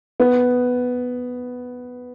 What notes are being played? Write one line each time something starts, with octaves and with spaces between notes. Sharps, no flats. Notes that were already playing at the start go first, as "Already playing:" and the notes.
B3